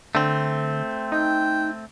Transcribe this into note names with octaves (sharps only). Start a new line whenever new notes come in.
D3 A3 C4
D#4 G5